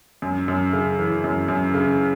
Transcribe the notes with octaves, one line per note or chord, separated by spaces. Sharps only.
F#2
F#2
C#3
E3
F#2
F#2
C#3